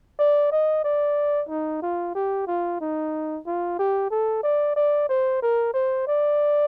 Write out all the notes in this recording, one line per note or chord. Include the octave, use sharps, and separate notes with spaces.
D5
D#5
D5
D#4
F4
G4
F4
D#4
F4
G4
A4
D5
D5
C5
A#4
C5
D5